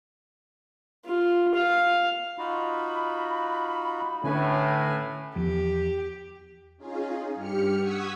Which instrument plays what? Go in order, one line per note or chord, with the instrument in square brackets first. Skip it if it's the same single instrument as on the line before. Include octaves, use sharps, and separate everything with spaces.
[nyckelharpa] F4
F5
[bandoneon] D#4 F4 F#4 [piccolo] B5
[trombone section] A2 [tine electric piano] D3 C#4 [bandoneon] B4 G#5
[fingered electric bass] E2 F3 [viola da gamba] G4
[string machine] C#4 D#4 F4 G#4
G2 G4 F6 C#7
F#5 C#6 D#6 E6 G#6 B6